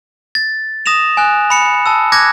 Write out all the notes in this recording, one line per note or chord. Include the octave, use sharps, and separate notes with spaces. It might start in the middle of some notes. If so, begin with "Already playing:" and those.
A6
D#6 A#6 E7 F7
G#5 F#6
B5 C#7
A5 E6
D6 F#6 G#6 A#6